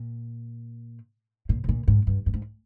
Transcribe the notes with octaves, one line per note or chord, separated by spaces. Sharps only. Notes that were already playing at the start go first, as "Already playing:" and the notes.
Already playing: A#2
A#2
C3
A#2
G#2
G2
G2
G#2